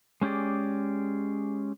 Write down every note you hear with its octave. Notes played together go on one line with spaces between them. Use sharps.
G#3 C#4 G4 G#4 D5